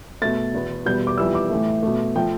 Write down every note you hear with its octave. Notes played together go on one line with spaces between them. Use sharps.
B2 A3 A6
E2 B2 B3
E2 B2 G3 B3 G6
D6
F2 E3 G3 B3 E6
D6
A2 E3 A3
B2 A3
F3 A3 G5